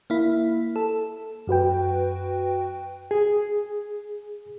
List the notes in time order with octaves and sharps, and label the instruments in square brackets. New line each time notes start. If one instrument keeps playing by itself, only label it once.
[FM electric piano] A#3 E4
A4
F#2 F#4 B4 G5
[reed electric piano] G#4